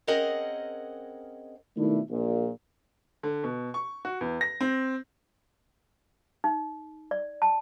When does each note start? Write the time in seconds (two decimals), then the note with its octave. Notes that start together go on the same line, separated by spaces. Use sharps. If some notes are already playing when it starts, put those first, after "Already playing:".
0.07 C4 C#4 G#4 A#4 D#5 F#5
1.77 B2 D#3 A3 D4 E4
2.10 A#1 A#2
3.23 D3
3.44 B2
3.74 C#6
4.05 F#4
4.21 E2
4.41 A#6
4.61 C4
6.44 D#4
7.11 D5
7.42 A5